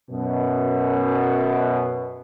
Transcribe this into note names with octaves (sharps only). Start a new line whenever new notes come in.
F#2 B2